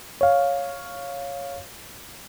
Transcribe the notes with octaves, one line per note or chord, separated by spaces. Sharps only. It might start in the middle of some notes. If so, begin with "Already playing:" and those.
C#5 F5